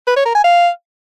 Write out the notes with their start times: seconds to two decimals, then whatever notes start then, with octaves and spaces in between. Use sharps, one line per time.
0.07 B4
0.16 C#5
0.26 A#4
0.35 G#5
0.44 F5